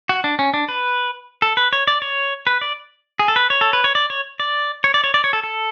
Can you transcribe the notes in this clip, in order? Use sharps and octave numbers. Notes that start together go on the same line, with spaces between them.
F#4
D4
C#4
D4
B4
A4
B4
C#5
D5
C#5
B4
D5
G#4
A4
B4
C#5
A4
B4
C#5
D5
C#5
D5
C#5
D5
C#5
D5
C#5
A4
A4